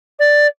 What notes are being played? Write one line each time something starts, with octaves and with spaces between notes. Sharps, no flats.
D5